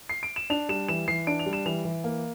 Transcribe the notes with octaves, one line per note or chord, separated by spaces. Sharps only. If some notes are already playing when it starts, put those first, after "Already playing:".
C7
D7
E7
D4 F7
G3 E7
E3 E7
E3 C7
D4 D7
F7
G3
E7
E3 F7
E3
A#3